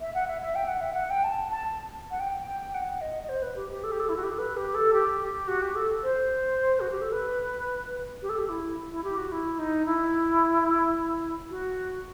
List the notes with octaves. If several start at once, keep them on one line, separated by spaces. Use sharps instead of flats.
E5
F#5
E5
E5
G5
F#5
E5
F#5
G5
A5
A5
F#5
G5
G5
F#5
D#5
D#5
C5
B4
G4
G4
A4
G4
A4
E4
F#4
G4
A4
B4
G4
A4
G4
G4
F#4
G4
A4
C5
F#4
G4
A4
B4
G4
A4
G4
E4
E4
G4
F#4
E4
D#4
E4
F#4